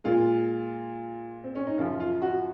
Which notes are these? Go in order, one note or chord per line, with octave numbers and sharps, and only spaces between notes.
A#2 G#3 F4
C4
C#4
D#4
F#2 C#3 F3 F4
F4
F#4